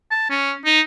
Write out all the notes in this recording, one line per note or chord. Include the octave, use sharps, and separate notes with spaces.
A5
C#4
D#4